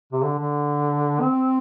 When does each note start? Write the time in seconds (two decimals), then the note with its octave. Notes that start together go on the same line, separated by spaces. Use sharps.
0.12 C3
0.23 D3
0.39 D3
1.21 C4